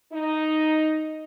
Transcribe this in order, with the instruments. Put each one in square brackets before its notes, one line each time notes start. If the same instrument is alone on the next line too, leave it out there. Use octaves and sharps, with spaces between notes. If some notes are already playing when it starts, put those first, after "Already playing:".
[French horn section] D#4